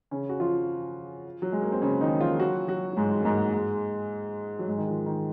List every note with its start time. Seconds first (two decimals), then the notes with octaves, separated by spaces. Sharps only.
0.11 C#3 C#4
0.29 F#4
0.40 F3 F4
1.42 F#3
1.52 G#3
1.62 A#3
1.72 C4
1.82 C#3 C#4
2.01 D#3 D#4
2.20 F3 F4
2.40 F#3 F#4
2.68 F#3 F#4
2.92 F#3
2.97 G#2 G#3
3.21 A#3
3.25 G#2 G#3
3.54 G#2 G#3
4.59 F#3
4.68 G#2 G#3
4.78 D#3
4.87 F3
5.06 D#3